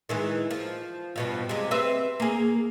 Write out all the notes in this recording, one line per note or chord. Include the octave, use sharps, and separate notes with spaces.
D#3 E3 G#3
F3
G2 B2 F3
C3 G#3
C4 B4 E5
A#3 G#4